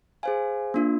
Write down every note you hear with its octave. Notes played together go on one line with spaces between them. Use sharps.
G#4 C5 F5 G#5
A#3 D4 F4